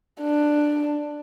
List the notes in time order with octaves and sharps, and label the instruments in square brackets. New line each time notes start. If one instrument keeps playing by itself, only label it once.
[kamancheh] D4